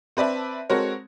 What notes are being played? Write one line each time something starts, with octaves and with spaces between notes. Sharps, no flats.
C4 B4 D5 E5 A5
G#3 C4 F#4 A4 A#4 C#5